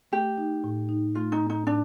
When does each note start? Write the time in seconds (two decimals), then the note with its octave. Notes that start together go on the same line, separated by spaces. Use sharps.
0.12 A3 G4
0.38 D#4
0.64 A2
0.89 D#4
1.15 A3 F4
1.32 D#4
1.40 A2
1.50 D#4
1.67 A2 D4